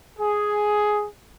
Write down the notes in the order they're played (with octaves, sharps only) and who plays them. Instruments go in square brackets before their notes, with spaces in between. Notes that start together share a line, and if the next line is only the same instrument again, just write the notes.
[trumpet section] G#4